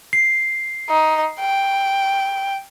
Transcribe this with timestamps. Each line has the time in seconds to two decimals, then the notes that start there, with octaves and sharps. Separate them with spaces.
0.13 C7
0.90 D#4
1.40 G5